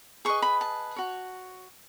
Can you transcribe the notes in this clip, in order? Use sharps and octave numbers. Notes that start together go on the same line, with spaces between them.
G#4 B4 D#5 C#6
B5
A5
F#4 C#5